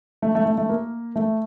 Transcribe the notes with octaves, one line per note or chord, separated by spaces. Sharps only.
A3
A3
A3
A3
A#3
A3